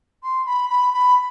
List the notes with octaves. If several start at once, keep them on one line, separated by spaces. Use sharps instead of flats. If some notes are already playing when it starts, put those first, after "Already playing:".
C6
B5
B5
B5